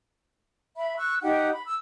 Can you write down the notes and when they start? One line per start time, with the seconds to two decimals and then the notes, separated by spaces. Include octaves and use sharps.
0.77 E5 B5
0.97 C#6 E6 F#6
1.22 D#4 G4 F#5 G5
1.51 B5
1.64 E6